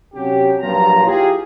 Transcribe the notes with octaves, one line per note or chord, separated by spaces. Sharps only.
C3 F#3 C#4 G4
A#1 G2 F#3 F4 A#5
E4 F4 G4 G#4